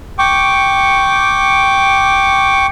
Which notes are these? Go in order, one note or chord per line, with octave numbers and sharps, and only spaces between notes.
G5 C#6 D6